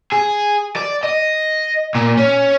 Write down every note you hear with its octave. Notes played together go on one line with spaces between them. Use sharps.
G#4
D5
D#5
A#2
C#4